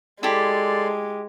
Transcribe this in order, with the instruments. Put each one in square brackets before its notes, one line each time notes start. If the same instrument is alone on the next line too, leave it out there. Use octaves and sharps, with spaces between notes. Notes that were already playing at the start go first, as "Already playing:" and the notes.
[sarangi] G#3 [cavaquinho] E4 G4 [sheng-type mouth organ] A4 D5 C6